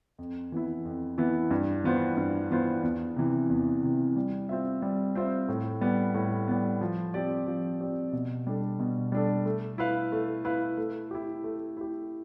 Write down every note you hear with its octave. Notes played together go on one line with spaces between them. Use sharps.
F2
E3 B3 E4
F2
E3 B3 E4
G2
E3 B3 F4 C5
G2
E3 B3 F4 C5
E2
C3 E3
E2
C3 E3
G3
C4 F4 C5 E5
G3
C4 F4 C5 E5
A2
G3 B3
A2
G3 B3
F3
C4 G4 D5
F3
C4 G4 D5
B2
G3 D4 A4
B2
G3 D4 A4
A3
E4 B4 F5
A3
E4 B4 F5
A3
E4 G4
A3
E4 G4